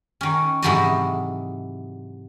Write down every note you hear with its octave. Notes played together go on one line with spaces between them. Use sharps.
D#3 C#4
G#2 C3 E3 F#3 A4 D#5